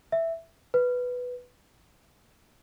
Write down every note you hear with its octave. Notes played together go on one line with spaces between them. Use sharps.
E5
B4